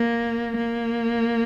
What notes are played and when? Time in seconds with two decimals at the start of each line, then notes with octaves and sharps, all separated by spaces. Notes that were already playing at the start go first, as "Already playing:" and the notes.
Already playing: A#3
0.58 A#3